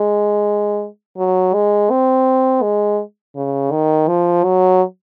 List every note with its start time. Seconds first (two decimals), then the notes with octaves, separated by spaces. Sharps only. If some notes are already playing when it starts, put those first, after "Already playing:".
Already playing: G#3
1.18 F#3
1.54 G#3
1.90 C4
2.62 G#3
3.36 C#3
3.71 D#3
4.08 F3
4.44 F#3